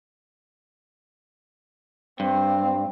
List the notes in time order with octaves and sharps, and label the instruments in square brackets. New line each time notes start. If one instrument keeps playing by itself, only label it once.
[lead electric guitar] G2 [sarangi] C4